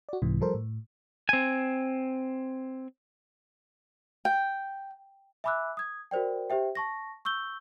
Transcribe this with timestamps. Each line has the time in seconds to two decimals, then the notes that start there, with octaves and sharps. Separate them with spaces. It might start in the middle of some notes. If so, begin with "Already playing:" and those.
0.09 F#4 D5
0.22 C2 G#2 C3 E3
0.41 F3 G3 A4 A#4 C5
0.54 A2
1.29 C4 G#5
4.25 G5
5.44 E5 G#5 B5 D6 E6 F#6
5.77 D#6 G#6
6.11 F#4 A#4 C5 D5 G5
6.50 G4 C5 E5 G5
6.75 A5 C#6 A#6
7.25 C#6 E6 G6 G7